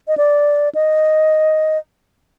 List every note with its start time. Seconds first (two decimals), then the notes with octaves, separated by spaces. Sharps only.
0.08 D#5
0.17 D5
0.75 D#5